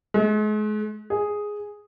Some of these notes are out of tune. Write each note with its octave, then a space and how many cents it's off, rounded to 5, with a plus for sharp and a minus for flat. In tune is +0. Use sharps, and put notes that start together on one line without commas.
G#3 +40
G#4 +0